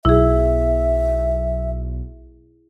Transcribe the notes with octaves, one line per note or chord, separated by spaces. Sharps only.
B1 E4 G#4 E5